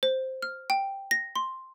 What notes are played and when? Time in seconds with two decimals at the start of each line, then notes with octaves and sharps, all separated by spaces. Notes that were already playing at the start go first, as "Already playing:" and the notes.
0.03 C5
0.42 F6
0.70 G5
1.11 A#6
1.36 C6